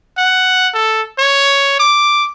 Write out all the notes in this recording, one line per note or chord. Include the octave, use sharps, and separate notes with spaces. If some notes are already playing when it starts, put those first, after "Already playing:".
F#5
A4
C#5
D6